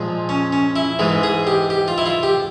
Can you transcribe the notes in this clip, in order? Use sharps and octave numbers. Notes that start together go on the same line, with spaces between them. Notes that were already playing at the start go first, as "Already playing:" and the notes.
Already playing: A#2 F3 G#3
C#4
C#4
E4
G#2 E3 G#3
G#4
G4
G4
F4
E4
F4
G4